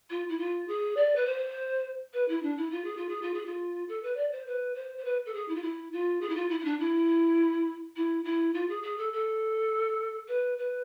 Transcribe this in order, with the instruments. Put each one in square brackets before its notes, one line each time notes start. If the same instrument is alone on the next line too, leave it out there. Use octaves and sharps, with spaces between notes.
[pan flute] F4
E4
F4
G#4
D5
B4
C5
B4
E4
D4
E4
F4
G#4
F4
G#4
F4
G#4
F4
A4
B4
D5
C5
B4
C5
C5
B4
A4
G#4
E4
F4
E4
F4
G#4
E4
F4
E4
E4
D4
E4
E4
E4
F4
G#4
G#4
A4
A4
B4
B4